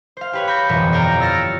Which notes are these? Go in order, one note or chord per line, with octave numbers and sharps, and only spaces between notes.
C5 F5
G4 B4 C#5
B5 C#6 G6 A#6
G1 F2 B2 E3
C#5 D5 F5 G5 A#5
E6 F6 A6 A#6 C#7